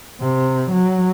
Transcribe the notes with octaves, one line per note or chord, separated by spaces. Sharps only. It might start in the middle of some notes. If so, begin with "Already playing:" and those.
C3
F#3